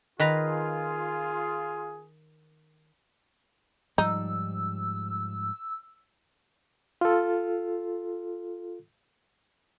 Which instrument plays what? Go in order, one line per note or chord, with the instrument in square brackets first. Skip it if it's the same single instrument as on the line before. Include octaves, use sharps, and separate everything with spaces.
[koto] D#3 B4 A#5 [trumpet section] F4 G#4
[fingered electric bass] G#2 F3 G3 [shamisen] D#4 [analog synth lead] E6
[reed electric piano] F4 A4